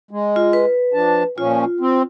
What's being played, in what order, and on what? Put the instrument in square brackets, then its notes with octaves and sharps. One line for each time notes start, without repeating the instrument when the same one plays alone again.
[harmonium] G#3
[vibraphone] F4
B4
[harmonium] F3 D4 A5
[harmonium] A#2 F3 C#4 [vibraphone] F4
[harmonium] C4